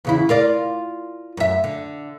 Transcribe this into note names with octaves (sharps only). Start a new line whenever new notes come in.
E2 C#3 E4
F4 A#4 D5
F#2 E5
D3